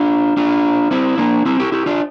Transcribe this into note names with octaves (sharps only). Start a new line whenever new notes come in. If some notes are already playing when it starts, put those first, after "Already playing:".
Already playing: D4 F4
D4 F4
C4 E4
A#3 D4
C4 E4
E4 G4
E4 G4
D4 F4